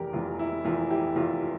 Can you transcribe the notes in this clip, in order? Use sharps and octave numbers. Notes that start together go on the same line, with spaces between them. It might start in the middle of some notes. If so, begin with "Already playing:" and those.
Already playing: F1 E2 E3 G4 A#4
F1 E2 E3 F4
E4
F1 E2 E3 F4
E4 G4
F1 E2 E3 F4
F4